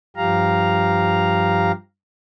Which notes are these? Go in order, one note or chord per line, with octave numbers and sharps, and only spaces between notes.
G2 F3 G4 F5 A#5